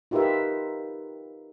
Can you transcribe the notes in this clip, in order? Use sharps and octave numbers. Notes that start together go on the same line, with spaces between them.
D#4 F4 G4 A#4 B4 E5